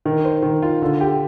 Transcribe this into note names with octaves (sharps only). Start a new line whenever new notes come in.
D#3
C5
D#3
F4
D3
G4